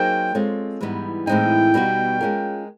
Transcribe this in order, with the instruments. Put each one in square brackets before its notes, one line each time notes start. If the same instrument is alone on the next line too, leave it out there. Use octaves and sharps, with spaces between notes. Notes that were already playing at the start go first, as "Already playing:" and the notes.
Already playing: [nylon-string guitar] F#3 A#3 D#4 G#4 C5 [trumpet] G5
[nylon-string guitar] G#3 C4 F4 A4 C#5
G#2 E3 G3 B3 D#4
[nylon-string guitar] A2 E3 G#3 C4 D#4 [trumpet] G5
[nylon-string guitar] B2 G3 B3 D#4 F#4
G#3 C#4 F4 A#4